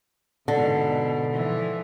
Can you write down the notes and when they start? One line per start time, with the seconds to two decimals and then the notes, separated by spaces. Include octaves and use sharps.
0.48 G#2 B2 D3
1.33 E3 F3